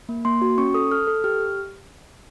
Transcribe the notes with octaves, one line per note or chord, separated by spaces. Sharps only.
A#3
A#3 C6
F#4
C#4 C#6
A4 D#6
A4 F6
A4
G4 F6